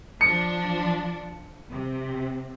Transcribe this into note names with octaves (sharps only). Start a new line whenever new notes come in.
F3 D4 C#7
C3